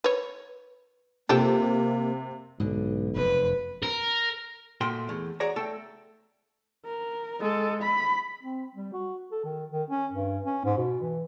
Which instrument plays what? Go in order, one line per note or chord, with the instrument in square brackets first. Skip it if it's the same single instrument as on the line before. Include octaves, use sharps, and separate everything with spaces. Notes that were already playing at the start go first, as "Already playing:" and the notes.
[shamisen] B4 C#5
[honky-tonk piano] C3 [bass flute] A#3 [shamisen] F4 G4 A4
[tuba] B1 [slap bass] G#2 B2 D3
[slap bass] F1 F#2 [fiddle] B4
[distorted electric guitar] A#4
[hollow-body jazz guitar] A#2 A3 F#4 G5 C6
E2 A3
F#4 G#4 C#5 D5 A#5
A3 A4 G5 A5
[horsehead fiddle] A#4
G#3 A4
B5
[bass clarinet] C4
G3
F#4
A4
D#3
D#3
C#4
G2
C#4
G#2
B2
E3